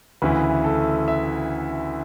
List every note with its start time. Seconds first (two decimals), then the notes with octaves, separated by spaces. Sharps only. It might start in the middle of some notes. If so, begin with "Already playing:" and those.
0.22 D2 C#3 E3 B4
0.64 A4
1.08 E5